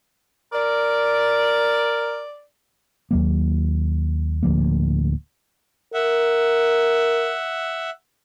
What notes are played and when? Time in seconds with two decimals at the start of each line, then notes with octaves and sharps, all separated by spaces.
0.53 A#4 D5
3.11 D#2 F#3 A#3
4.43 D1 D2 F3 A#3
5.94 A#4 E5 F#5